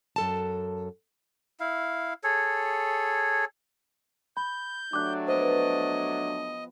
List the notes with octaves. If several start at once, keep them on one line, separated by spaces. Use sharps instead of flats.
F#2 A4 A5
E4 F5
G#4 A4 C#5
B5 G6
F#3 A3 D4 G4 D6 F#6
F3 B3 C5 D#5